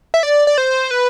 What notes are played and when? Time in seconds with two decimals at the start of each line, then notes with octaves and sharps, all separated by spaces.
0.14 E5
0.23 D5
0.47 D5
0.58 C5
0.91 B4